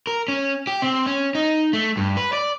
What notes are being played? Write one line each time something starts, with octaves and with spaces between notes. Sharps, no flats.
A#4
C#4
G4
C4
C#4
D#4
A3
G2
B4
D5